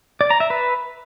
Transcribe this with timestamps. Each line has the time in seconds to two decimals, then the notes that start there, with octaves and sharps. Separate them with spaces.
0.21 D5
0.30 A#5
0.40 E5
0.50 B4